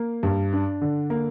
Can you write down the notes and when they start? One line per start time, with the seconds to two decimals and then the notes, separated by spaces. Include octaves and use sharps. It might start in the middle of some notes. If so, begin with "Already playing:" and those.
Already playing: A#3
0.23 G2
0.53 D4
0.81 D3
1.10 A#3